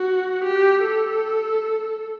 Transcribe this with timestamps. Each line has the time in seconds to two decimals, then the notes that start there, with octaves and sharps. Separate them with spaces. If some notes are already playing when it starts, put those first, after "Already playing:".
Already playing: F#4
0.44 G4
0.83 A4